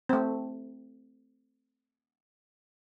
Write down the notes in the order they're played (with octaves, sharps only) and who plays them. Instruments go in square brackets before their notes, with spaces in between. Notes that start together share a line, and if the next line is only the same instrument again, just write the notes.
[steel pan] A3 C4